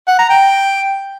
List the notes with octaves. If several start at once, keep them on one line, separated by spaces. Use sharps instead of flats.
F#5
A#5
G5